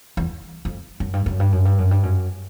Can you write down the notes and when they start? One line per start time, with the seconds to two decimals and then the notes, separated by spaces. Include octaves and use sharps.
0.17 E2
0.65 F2
1.00 F#2
1.13 G2
1.26 F#2
1.40 G2
1.52 F#2
1.65 G2
1.78 F#2
1.91 G2
2.03 F#2